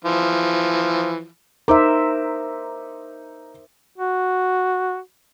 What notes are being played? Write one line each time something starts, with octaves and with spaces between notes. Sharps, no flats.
E3 F3
D#4 A#4 C5 E5 D6
F#4